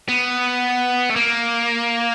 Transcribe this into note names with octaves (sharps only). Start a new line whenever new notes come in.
B3
A3
A#3